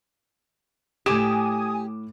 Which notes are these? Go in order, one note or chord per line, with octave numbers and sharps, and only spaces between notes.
A2 G4 G#5 D6 D#6 E7